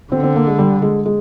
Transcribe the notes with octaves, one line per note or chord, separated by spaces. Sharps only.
D3 C4
C4
A#3
G#3
G3
G#3
G#3